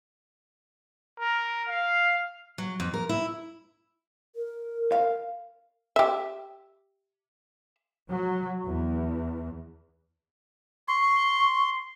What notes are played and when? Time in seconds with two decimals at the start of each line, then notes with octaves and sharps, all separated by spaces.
1.20 A#4
1.69 F5
2.58 F#3
2.80 F2
2.94 A#4
3.09 E4
4.36 A#4
4.92 F5
5.96 G4 E5
8.10 F#3
8.67 E2
10.88 C6 C#6